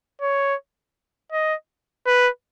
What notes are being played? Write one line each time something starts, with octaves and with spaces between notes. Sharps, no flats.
C#5
D#5
B4